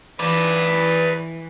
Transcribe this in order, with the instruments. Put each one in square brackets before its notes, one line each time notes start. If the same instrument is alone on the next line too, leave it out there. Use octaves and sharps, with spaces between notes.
[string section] E3 [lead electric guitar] B4 D5